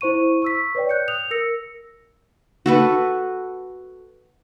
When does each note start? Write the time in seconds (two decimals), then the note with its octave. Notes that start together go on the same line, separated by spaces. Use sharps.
0.01 E4 C5 C#6 D#7
0.42 C#6 E6 B6
0.75 B4 C#5 D5 G5
0.89 F#6 G6 C#7
1.08 D#6 F7
1.31 A#4 E6 A#6 C#7
2.66 F#4 A4 B4